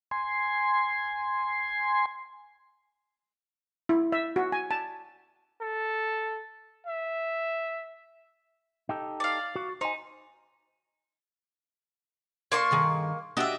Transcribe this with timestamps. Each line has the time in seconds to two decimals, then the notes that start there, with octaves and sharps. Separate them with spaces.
0.11 G#5 C6
3.89 E4
4.12 E5
4.36 F#4
4.52 G#5
4.71 A5
5.61 A4
6.87 E5
8.89 D#4 G4 A4
9.20 D5 F5
9.56 F#4
9.81 D#4 C5 G#5
12.52 A#3 D5 C6 C#6
12.71 G2 D#3 G#4
13.37 D4 F#4 G4 D#5 E5